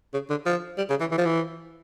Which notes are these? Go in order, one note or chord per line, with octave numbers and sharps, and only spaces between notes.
C#3
D3
F3
G3
C#3
E3
E3
F3
E3